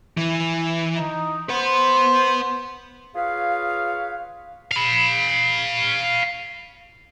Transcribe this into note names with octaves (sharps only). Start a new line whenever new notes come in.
E3
D#4
B4 C5 F#5
F4 G#4 B4 C#5 F5
F5 B5